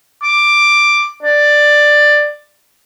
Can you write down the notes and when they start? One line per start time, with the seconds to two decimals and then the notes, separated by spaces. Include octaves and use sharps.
0.23 D6
1.23 D5